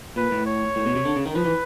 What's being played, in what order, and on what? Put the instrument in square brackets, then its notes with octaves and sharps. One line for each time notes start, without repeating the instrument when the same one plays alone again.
[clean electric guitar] A#2 [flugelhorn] B4
[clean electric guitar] A2
[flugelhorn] C#5
[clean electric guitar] A2
B2
C3
D3
C#3
D#3
[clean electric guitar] F3 [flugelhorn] B4
[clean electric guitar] E3